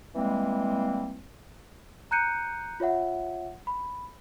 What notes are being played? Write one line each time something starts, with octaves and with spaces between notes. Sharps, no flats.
E3 G3 G#3 A#3 C4
A#5 F#6 G6 C#7 D#7
F4 C#5 E5 F#5
B5